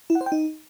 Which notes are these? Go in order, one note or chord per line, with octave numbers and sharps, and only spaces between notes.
E4
F#5
C5
G5
D#4